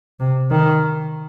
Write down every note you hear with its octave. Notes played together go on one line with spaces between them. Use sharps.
C3
D#3